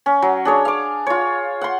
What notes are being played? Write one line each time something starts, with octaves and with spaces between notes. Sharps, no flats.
C#4
F#3
D4 G#4 C#5
F5 D6
F4 C#5
F#5 C6